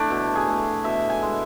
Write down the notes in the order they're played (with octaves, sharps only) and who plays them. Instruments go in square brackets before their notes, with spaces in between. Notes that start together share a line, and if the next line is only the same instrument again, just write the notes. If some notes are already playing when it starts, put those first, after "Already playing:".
Already playing: [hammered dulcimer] A3 D4 E4
B2
G#4
A3
B2 E5
G#5
G#3